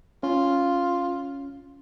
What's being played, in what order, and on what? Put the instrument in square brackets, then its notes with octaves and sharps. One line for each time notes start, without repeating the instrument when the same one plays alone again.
[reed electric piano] C#4 [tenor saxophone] F4